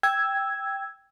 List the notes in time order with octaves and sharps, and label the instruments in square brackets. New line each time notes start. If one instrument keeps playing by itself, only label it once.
[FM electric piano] G5 E6 G#6